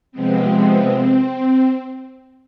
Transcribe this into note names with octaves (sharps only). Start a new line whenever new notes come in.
C3 F3 G#3 B3 C4